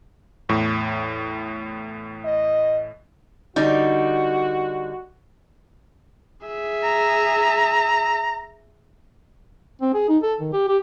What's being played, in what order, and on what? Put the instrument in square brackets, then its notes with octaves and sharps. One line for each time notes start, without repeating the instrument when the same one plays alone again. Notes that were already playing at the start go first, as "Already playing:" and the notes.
[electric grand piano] E2 A2
[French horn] D#5
[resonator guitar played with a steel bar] D3 G3 D#4 [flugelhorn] F#4
[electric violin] G#4 E5
[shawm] A#5
[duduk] C4
G#4
D#4
A4
D#3
G4
G4